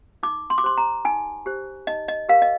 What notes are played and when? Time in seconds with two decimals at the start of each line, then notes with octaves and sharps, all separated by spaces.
0.23 D#4 D6
0.50 C6
0.58 D6
0.63 G4 C5 C6
0.77 A#5
1.05 D#4 G#5
1.46 G4 C5
1.87 D#4 D#5
2.08 D#5
2.28 G4 A#4 F5
2.42 D#5